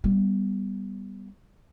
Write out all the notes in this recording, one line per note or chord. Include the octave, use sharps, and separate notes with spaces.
G3 B3